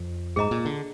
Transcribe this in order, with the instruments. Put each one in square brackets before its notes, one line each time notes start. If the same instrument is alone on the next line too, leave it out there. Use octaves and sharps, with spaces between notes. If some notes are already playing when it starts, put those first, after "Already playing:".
Already playing: [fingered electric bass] F2
[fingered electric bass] G#2 [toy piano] G#4 D#5 A#5
[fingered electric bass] A#2
D3